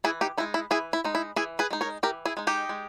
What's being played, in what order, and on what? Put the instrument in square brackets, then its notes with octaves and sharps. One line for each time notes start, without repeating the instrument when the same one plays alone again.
[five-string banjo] E3 E4 G#4
D#4 G4
G#3 D#4 E4
E4
E3 E4 G#4
E4
G#3 D#4
E4
E3 E4 G#4
G#4 B4
G#3 D#4
A#4 C#5
E3 G4 A#4
E4 G#4
G#3 D#4
D#4 G4
G#3